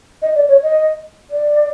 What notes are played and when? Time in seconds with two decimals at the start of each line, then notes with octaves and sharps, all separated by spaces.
0.22 D#5
0.35 D5
0.48 C#5
0.63 D#5
1.30 D5